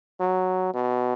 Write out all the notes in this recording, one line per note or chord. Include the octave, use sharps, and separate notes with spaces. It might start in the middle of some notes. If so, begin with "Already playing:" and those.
F#3
B2